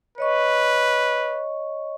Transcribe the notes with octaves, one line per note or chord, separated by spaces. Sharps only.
B4 C#5 D#5 C#6